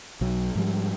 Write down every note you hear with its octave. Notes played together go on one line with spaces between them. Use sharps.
B1 F#3
G#2 F3 G3